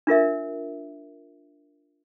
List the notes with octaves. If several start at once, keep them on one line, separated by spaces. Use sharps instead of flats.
D4 F4 A#4 E5